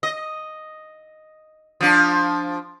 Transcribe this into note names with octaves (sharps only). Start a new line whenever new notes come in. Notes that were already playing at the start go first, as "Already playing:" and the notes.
D#5
F3 D4